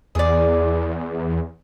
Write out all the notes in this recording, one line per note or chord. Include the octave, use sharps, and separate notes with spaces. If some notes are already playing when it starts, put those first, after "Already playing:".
E2 G#4 D5